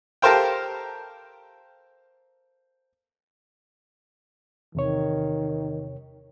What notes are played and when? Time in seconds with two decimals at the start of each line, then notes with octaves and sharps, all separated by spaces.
0.22 G4 A4 A#4 C5 F5 G5
4.75 E2 C3 D#3 C#5